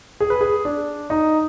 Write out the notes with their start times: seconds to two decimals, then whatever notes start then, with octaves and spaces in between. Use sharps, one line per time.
0.20 G#4
0.30 B4
0.41 G#4
0.65 D4
1.10 D#4